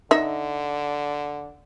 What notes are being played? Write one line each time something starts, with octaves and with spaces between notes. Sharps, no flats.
D3 D#4 E5